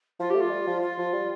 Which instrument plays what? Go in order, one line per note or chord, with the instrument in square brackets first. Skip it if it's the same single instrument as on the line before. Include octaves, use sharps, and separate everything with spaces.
[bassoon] F3 [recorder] F4
[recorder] G4
[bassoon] A3
[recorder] F4
[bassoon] G3
F3
[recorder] F4
[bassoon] F3
G3